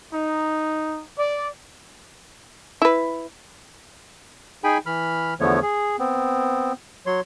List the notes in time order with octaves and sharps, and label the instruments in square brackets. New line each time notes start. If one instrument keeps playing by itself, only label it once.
[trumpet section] D#4
D5
[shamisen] E4 B4
[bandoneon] D#4 G#4 G5 G#5 B5
E3 B5 F6
E2 D3 F3 A3 B3 C#5
G#4
B3 C4
F#3 C#5 C6